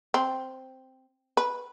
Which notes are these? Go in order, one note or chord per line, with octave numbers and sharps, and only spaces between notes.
C4
B4